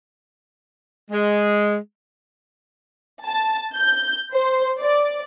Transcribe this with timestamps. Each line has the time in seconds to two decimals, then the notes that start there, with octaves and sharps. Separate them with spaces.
1.11 G#3
3.25 A5
3.76 G6
4.33 C5
4.79 D5